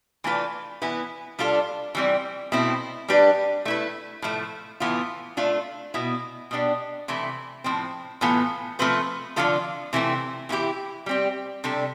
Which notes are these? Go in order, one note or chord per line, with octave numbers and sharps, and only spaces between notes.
E3 A3 D4 F4 B4
E3 B3 E4 B4
G3 D4 F4 A4
E3 G3 C4
B2 A3 C4 E4
G3 D4 G4 B4
A3 E4 B4
A2 F3 A3
A2 E3 B3 F4
A3 D4 F4 A4
B2 B3 E4
B2 B3 D4 G4
C3 E3 A3 E4
A2 F3 C4
A2 E3 B3 F4 A4
F3 A3 C4 F4 B4
D3 F3 C4 F4 A4
C3 E3 A3 C4
E3 B3 E4 G4
G3 C4 G4
C3 G3 D4 A4